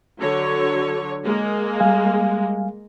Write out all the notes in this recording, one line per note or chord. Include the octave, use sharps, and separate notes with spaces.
D3 F#3 C#5
G#3 A#3
G3 F5 G#5